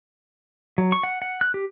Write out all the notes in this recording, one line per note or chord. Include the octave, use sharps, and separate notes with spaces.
F#3
C#6
F#5
F#5
F#6
G4